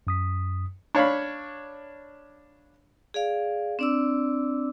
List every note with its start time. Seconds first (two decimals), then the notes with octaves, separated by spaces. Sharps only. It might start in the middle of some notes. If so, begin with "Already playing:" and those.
0.07 F#2 D#6 B6
0.95 D4 C#5 F5 B5
3.14 G#4 D5 F5
3.79 C4 D4 D5 D6 E6